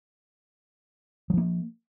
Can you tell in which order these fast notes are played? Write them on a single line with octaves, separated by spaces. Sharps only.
F#3 F3 A#3